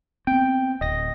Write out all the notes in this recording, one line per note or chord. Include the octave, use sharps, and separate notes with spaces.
B3 C4 G5
D1 D#5 A#6